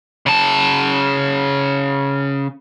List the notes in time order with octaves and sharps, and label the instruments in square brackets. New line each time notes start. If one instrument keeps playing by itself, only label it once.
[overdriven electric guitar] C#3 A5